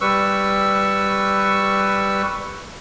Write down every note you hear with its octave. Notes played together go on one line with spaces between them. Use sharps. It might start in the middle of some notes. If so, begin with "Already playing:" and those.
G3 B4 C#6 E6